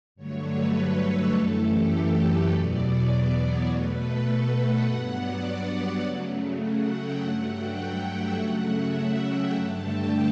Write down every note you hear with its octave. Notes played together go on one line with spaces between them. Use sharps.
G2 D3 F#3 A3 C#5
B4
A4
F#2 E3 A3
G4
A4
B4
E2 B2 F#3 B3 D5
C#5
B2 A3 B4
A4
F#5
G2 F#3 B3
D5
C#3 F#3 A3
F#5
G5
G2 F#3 A3 F#5
G5
F#5
E5
C#3 F#3 A3 F#5
E5
F#5
G5
G2 D3 A3 A5
G5